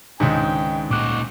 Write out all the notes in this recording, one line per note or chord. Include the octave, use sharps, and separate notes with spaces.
C#2 G#2 D#3 D4 D#4 G5
A#2 D#4 F#4 D6 F#6